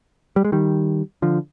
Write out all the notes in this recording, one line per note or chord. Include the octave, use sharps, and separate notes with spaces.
G3
G#3
D#3 G3
D3 F3